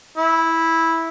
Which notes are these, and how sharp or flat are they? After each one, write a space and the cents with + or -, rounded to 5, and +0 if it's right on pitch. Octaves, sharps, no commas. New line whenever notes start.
E4 -10